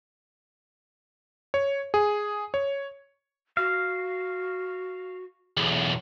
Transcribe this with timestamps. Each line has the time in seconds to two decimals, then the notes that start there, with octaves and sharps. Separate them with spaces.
1.54 C#5
1.94 G#4
2.54 C#5
3.57 F#4 F5
5.57 B1 E2